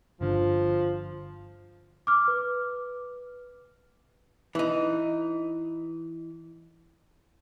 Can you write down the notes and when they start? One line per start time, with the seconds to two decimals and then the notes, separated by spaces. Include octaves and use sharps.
0.21 G1 D3 F3
2.07 D6 F6
2.28 B4
4.55 E3 D#4